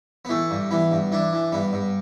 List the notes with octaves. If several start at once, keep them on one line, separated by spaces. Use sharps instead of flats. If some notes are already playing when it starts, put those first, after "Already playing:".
B3
E3 A3
G2
E3 B3
G2
E3 D4
E3
G2 B3
G2